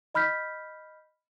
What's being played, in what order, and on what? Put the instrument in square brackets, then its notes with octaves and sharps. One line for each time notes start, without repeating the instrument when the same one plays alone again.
[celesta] D#5 B5 F6 G6 B6